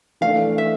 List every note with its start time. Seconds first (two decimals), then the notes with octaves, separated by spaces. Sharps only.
0.21 E3 A3 D4 F5
0.58 E5